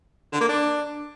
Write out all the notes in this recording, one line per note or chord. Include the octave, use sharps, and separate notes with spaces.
D3
A#3
D4